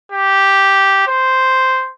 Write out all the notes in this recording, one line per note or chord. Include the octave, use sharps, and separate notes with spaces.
G4
C5